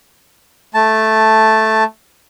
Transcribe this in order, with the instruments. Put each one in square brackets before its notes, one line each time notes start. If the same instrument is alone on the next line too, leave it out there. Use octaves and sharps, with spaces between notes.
[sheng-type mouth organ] A3 A5